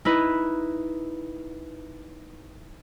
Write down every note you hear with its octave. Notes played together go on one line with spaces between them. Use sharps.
D#4 E4 B4